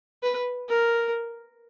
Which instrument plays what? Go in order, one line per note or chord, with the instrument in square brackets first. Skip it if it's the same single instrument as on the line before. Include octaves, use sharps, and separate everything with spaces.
[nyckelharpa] B4
A#4